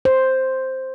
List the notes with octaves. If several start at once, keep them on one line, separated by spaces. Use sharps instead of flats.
C5